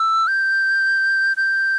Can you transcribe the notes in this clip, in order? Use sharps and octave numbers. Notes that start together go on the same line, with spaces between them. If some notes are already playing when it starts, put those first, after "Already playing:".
Already playing: E6
G6
G6